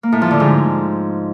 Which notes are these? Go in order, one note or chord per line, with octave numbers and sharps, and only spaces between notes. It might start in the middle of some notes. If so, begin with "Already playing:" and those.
A#3
A2
F3
D3
G#2